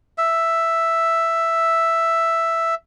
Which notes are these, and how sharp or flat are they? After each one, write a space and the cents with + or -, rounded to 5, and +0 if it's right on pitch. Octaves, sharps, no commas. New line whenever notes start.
E5 +5